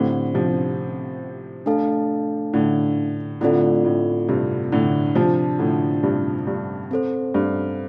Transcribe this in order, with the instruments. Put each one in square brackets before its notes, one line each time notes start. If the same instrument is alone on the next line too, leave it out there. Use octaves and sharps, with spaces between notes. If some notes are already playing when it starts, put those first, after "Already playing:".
Already playing: [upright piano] A2 D3 [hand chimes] C4 G4 C5
[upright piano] C3 F3
[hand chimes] A3 D4 A4 F5 A5
[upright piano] A2 D3
[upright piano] A2 D3 [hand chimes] A3 C4 F4 A4 D5
[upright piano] A2
G2 C3
A2 D3
[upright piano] C3 F3 [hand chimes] D4 F4 D5 A5
[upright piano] A2 D3
G2 C3
G2
[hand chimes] C4 A4 C5
[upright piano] G2